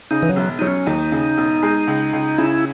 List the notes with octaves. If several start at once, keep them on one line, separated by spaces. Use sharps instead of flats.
C#3 D#4
E3
F#3
E1
F#3 D#4
C#4
D#2 D#4
C#3
E1
G#3
C#2
C#2
C#3 E4